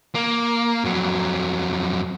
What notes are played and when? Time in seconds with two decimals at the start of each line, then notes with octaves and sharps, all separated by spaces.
0.15 A#3
0.84 F2 F#3